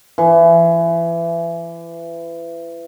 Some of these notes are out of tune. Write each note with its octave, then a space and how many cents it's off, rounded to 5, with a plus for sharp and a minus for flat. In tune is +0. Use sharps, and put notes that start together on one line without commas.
E3 +30